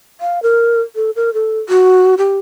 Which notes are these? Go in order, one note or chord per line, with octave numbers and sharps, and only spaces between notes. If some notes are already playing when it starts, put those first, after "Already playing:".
F5
A#4
A4
A#4
A4
F#4
G4